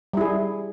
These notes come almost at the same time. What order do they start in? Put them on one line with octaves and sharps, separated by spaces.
G3 E4 G#4